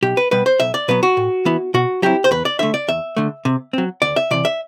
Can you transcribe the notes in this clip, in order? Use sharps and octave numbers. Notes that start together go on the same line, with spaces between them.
B1 G4
B4
B2 G3 B3 B4
C5
B1 E5
D5
B2 F#3 B3 B4
F#4
A2
E3 B3 E4
B2 F#4
F#3 C4 E4 G4
C5
E2 B4
D5
D3 A3 E5
D5
E2 E5
D3 A3
C3
F#3 C4
D2 D5
E5
C3 E3 D5
E5